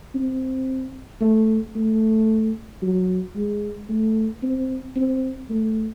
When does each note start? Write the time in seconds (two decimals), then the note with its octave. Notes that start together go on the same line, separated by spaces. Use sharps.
0.15 C4
1.21 A3
1.76 A3
2.82 F#3
3.35 G#3
3.89 A3
4.43 C4
4.96 C4
5.50 A3